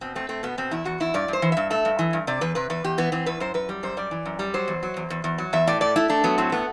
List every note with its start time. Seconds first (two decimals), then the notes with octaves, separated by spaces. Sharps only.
0.01 B2 C4
0.16 A3 C4
0.29 A3 C4
0.43 B2 B3
0.58 B2 C4
0.71 E2 E4
0.85 E2 F#4
1.00 E2 E4
1.14 G2 D5
1.28 G2 C5
1.42 E3
1.52 G2 E5
1.70 A3 E5
1.85 G2
1.99 E3
2.13 G2
2.27 C3 D5
2.41 E2 B4
2.55 C3 B4
2.70 E2 B4
2.84 E2 G4
2.98 E3 B3
3.12 E3 C4
3.26 E2 B4
3.40 F#2 C5
3.54 F#2 B4
3.69 G3
3.83 F#2 C5
3.97 G3 D5
4.11 E3
4.26 F#2
4.39 G3
4.54 F#3 C5
4.68 E2
4.83 F#3
4.97 E2
5.10 E2
5.24 E2
5.38 F#3
5.53 E2 E5
5.67 A2 D5
5.81 A3 D5
5.96 A3 E4
6.09 A3 D4
6.24 F#3 B3
6.38 A2 C4
6.52 A3 B3